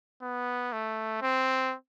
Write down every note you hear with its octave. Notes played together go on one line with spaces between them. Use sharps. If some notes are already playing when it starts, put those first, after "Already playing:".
B3
A3
C4